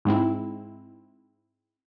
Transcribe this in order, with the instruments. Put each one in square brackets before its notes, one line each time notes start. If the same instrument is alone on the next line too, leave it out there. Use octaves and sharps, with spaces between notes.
[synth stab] G#2 G#3 C4 E4